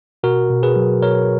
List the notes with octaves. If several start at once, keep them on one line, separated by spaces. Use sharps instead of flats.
B2 F#4 A#4
B2
G#4 B4
F#3
B2 A#4 C#5